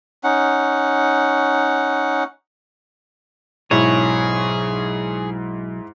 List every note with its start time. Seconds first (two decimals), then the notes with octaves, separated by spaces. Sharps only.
0.24 C#4 D#4 F#5
3.71 B1 G#2 E4 G#4 C#5